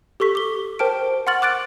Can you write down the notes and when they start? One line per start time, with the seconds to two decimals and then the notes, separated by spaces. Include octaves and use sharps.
0.20 G4 A4 C#6 B6
0.35 D6 G7
0.79 A#4 C5 G5 A5 F6 D7
1.27 F#5 C6 C#6 F6 A6 F#7
1.42 D6 F#6 A6 D7